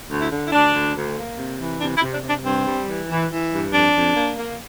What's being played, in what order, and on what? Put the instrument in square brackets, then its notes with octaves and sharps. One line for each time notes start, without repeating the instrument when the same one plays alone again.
[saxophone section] D2
E4
D3
E4
D2 D4
D2
D2
A#3
C3
E3
C3 D4
E4
C3
D4
C3
D4
G2 C4
G3
E3
E3
E3
G2
F2 D4
F2
A#3
A#3